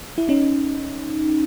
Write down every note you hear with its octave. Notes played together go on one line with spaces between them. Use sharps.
E4
C#4 D#4